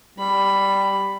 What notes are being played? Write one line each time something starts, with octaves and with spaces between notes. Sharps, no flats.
G3 B5